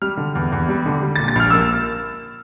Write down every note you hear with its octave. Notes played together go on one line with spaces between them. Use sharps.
G3 F6
D3
E2
E2
G3
D3
G3
A#2 A6
A6
A#1 F6
A#3 E6